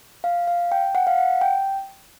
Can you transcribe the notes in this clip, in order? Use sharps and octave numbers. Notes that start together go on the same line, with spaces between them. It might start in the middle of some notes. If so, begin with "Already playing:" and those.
F5
F5
G5
F#5
F5
F#5
G5